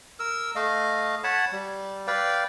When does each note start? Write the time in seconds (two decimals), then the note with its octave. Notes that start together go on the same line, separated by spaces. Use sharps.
0.19 A#4 E6
0.55 A3 D#5 F5
1.24 C#5 F#5 A5 B5
1.52 G3
2.07 B4 D5 F5 G5